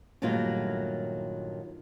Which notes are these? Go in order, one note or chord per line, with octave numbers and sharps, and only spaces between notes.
G2 A#2 D#3 F#3 A3 F4